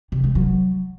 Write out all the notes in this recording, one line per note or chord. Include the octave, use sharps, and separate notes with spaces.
C3
G#3
F#3